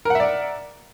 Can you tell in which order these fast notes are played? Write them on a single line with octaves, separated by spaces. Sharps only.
A#4 F#5 E5 D5